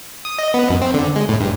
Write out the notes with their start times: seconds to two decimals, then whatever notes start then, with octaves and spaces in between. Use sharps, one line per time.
0.25 D#6
0.39 D#5
0.54 B3
0.70 F#2
0.81 C4
0.94 D3
1.16 G#3
1.29 A2
1.41 G2